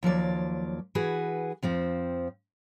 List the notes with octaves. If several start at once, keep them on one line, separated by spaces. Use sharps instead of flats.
D#2 F3 F#3 D5
E3 F#4 G#4 B4
F2 F3 C4